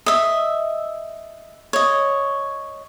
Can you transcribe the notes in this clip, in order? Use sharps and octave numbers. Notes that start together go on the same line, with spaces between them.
D#5 E5
C#5 D#5